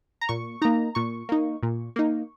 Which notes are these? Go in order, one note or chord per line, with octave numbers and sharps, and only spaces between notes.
A#5
A#2 C#6
A#3 D#4 A#5
A#2 C#6
A#3 D#4
A#2
A#3 D#4